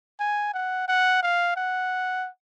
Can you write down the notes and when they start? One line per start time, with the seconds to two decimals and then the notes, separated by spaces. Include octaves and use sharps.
0.20 G#5
0.54 F#5
0.88 F#5
1.23 F5
1.56 F#5